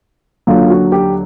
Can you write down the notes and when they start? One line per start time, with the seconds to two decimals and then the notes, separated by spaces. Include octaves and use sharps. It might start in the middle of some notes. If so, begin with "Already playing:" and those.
0.47 D#2 D3 F#3 F4
0.70 F#4
0.92 G4